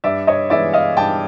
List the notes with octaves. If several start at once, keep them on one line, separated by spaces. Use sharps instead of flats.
G2 D5 E5
C#5 D#5
E3 G#3 B3 D5 E5
D#5 F5
G2 G5 A5